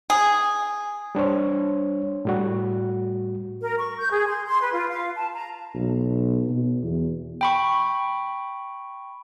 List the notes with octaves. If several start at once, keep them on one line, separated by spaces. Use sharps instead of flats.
G#4
G3 D4 C5 C#5
A2 G3 F#4
A#4
C#6
G6
G#4
C6
C6
B4
F4
F5
A5
A#5
B1
B2
E2
G5 B5 C#6